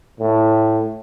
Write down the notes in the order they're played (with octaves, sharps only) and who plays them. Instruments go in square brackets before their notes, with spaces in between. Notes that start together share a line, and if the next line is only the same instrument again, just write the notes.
[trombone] A2